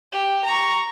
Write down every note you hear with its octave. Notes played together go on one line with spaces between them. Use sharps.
G4
A#5 C#6